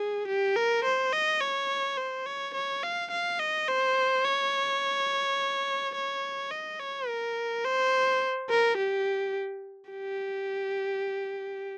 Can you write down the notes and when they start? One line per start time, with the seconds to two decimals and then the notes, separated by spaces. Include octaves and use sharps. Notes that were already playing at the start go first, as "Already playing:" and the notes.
Already playing: G#4
0.28 G4
0.56 A#4
0.85 C5
1.13 D#5
1.41 C#5
1.98 C5
2.26 C#5
2.55 C#5
2.83 F5
3.11 F5
3.40 D#5
3.68 C5
4.25 C#5
5.95 C#5
6.51 D#5
6.80 C#5
7.08 A#4
7.65 C5
8.50 A#4
8.78 G4
9.91 G4